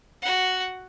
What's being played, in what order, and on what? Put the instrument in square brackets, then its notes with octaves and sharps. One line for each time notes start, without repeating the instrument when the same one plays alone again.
[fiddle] F#4 F#5